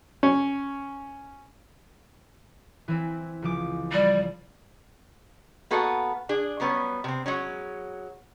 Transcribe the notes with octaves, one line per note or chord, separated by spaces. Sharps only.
C#4
E3 C4 E4
C#2 F3 D6
G3
A#3 B3 F#4 A4 D#5
D4 G#4
F#3 G3 B3 C#4
C3 C4
F#3 G#3 C#4